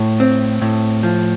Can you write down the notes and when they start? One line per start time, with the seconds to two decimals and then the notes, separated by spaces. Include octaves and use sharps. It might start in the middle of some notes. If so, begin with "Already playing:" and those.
Already playing: A2
0.20 C4
0.61 A2
1.03 F3